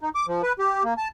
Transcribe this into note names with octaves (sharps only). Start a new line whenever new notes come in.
D#4
D6
F3
B4
G4
A#3
A5